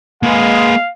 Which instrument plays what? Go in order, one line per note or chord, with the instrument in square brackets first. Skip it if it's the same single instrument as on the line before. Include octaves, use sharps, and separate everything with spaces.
[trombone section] G#3 [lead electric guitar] A#3 B4 [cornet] F5